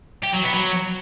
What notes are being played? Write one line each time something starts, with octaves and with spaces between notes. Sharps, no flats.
G4
F#3
B3
F#3